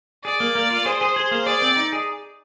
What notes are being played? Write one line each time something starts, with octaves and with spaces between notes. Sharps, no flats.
G#4 D5
A#3
A#3
F4
G#4 C5
G#4
G#4
A#3
G#4 D5
C4
D#4
G#4